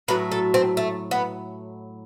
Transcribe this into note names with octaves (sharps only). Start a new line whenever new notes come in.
A2 F#3 A3 B4
A4
C4
A3
B3